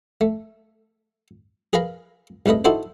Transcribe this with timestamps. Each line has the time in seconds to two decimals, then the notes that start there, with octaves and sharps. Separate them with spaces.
0.21 A3
1.73 G#4 A#4 B4 F5 A#5
2.46 C2 C#3 A3 B4 D#5
2.65 D#4 E4 F#4 A4 C5